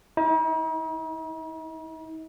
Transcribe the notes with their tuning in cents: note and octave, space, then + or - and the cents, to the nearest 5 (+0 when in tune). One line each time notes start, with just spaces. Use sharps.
D#4 +45